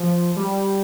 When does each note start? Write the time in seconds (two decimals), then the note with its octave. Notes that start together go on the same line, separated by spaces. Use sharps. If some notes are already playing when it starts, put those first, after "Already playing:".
Already playing: F3
0.36 G3